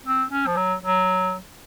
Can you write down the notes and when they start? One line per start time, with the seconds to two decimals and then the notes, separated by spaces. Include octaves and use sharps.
0.06 C4
0.31 C#4
0.47 F3
0.57 F#3
0.83 F#3